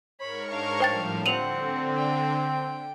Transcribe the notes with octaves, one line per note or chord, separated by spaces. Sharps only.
G#2 A#4 C#5 B5 C#6
D4 F5
A2 F3 G3 C5 G5 A6
D3 C4 F#5 D#7 F7 F#7
G5